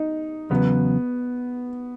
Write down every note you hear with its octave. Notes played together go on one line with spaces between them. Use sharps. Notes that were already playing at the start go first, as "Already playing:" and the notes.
Already playing: D#4
E2 C#3 F#3 B3